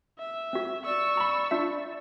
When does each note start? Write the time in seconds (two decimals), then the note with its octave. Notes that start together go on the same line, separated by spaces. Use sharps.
0.19 E5
0.53 C4 F#4
0.85 D5 C#6 E6
1.17 A#5 B5
1.51 D4 F4 E5